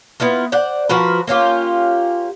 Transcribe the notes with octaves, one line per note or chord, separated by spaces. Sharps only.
B3 E4 F4 A#4
C5 D5 F#5
F3 F#4 A#4 B4
A#3 C#4 F4 G4